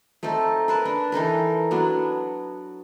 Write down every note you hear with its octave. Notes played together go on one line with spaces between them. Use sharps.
A3 C4 D#4 A4
A#4 B4 A5
D4
E3 D#4 A4 A#4
F#3 B3 D4